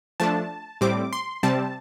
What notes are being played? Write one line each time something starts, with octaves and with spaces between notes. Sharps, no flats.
F3 A3 D4 A5
A2 G3 C4 D6
C6
C3 G3 C4 A5